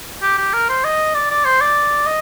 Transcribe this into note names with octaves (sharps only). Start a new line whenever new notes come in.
G4
G4
A#4
C5
D#5
D5
D5
C5
D5
D#5